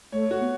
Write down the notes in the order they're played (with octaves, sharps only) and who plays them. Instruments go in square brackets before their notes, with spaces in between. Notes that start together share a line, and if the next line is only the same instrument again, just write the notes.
[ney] A3 [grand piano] C#5
[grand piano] F#4
[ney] B3